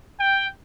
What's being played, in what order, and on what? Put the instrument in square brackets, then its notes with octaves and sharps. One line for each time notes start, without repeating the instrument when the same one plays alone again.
[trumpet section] G5